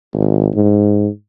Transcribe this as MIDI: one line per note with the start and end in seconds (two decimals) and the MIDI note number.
0.14 0.48 32
0.55 1.08 44